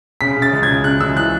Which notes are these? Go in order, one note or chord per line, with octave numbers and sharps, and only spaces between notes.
C#3 B6
C#3
A6
C#2
G#6
C#3
C#3 F#6
C#2 E6
E3 F#6